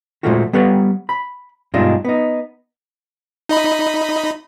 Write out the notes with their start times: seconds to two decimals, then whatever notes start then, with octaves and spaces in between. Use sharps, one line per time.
0.23 A#2 F3 G#3 A3 F4 F#4
0.53 G3 B3 B4 C#5 F#5
1.09 B5
1.74 G2 B2 G#3 D4 D#4 F4
2.05 B3 D#4
3.49 D#4 D#5 B5